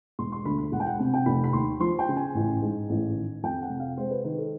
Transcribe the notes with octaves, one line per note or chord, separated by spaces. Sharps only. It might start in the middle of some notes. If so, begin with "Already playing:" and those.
E1 C6
C6
D2 B5
B5
E1 F#5
G5
F#5
C3 F#5
G5
F1 B5
B5
D#2 C6
F3 C6
G5
C#3
G#5
A1
G#2
A1
D#3
F2 G5
F#5
C3
F5
G#3 C5
B4
D#3 B4
A4